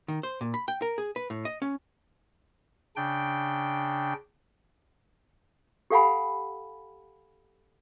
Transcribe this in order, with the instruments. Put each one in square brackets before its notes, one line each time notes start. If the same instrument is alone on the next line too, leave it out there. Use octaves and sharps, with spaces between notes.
[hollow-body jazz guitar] D#3
C5
A#2
B5
G5
A#4
G#4
B4
A2
D#5
C#4
[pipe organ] C#3 D4 G5 G6
[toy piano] G4 A4 F5 F#5 G#5 B5